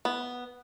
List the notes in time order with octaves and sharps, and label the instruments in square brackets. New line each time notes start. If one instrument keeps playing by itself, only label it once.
[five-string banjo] B3